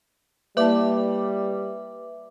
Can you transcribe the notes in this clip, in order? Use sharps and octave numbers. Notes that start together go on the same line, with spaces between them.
G3 A#3 E4 B4 D5 E5 A5 D6